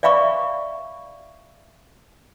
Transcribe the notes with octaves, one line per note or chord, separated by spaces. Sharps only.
D5 E5 F5 B5 C#6 D6